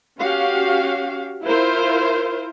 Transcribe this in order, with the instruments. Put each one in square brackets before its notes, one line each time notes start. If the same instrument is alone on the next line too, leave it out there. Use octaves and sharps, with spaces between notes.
[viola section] C#4 F#4 G4 F5
E4 F4 A#4 C5